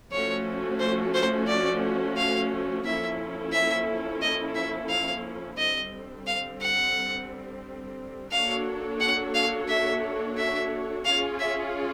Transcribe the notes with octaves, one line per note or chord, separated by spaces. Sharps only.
F3 A3 C#4 F#4 C#5
C5
C5
D5
F5
F3 A#3 C#4 E4 A4 E5
E5
D#5
E5
F5
D3 G3 C4 D#5
F5
F#5
A#3 D4 F#4 A4 C#5 F5
F#5
F5
E5
E5
C#4 F4 G#4 C#5 F5
E5